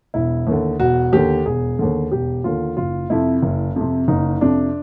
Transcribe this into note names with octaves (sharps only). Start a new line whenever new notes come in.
E1 E4
D#2 D3
E1 F#4
D#2 D3 G4
E1 G#4
D#2 D3
E1 G4
D#2 D3 F4
F#1 F4
F2 C3 E4
F#1
F2 C3
F#1 D#4
F2 C3 D4